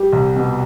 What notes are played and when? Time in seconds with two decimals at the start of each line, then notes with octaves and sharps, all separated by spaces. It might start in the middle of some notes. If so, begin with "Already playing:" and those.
Already playing: G3 G4
0.13 C2
0.36 B2